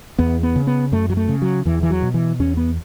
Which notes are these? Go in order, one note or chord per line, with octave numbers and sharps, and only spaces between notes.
E2 B3
B3
C#3
B3
F#2 A3
F#3
A3
C#3
F#3
E2 E3
E3
F#3
B2
E3
E2 C#4
B3